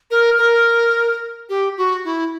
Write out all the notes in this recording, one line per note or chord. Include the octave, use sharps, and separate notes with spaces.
A#4
A#4
G4
F#4
E4